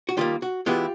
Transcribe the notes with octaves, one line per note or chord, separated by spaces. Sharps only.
F#4
D#3 G3 A#3 F4 G4
F#4
E3 G#3 B3 E4 F4 G4